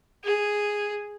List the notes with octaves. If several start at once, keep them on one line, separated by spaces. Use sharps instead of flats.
G#4